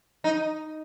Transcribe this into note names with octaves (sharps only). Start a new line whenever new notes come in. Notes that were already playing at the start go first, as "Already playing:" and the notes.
D#4